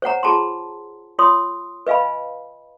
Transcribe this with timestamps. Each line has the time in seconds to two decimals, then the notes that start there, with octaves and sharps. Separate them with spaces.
0.02 C5 C#5 F#5 A#5
0.23 F4 G#4 A5 A#5 C6
1.19 F4 C#5 C6 D#6
1.87 B4 D#5 F5 G#5 B5